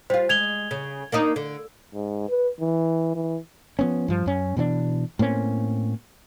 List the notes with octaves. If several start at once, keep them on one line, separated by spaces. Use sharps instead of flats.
G3 F4 C5
G#3 G#6 F7 G7
C#3
A#3 D4 D#4
D3
G#2
B4
E3
E3
F3 B3 C#4
G2 F3
F#2 C#4
B2 E3 C4 D4
A2 A#3 C4 C#4